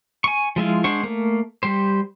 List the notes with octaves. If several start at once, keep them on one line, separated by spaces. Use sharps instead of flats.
G#5 C#6
F3 G#3 E4 F4
G#3 D4 C5 F#5 C#6
A3 A#3
G3 G4 C5